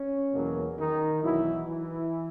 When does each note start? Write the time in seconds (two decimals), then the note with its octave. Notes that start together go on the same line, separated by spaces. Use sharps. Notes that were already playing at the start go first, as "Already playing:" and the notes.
Already playing: C#4
0.34 E2 B2 F#3 A#3
0.78 D#3 D#4
1.23 B1 B2 E3 F#3 E4
1.68 E3 E4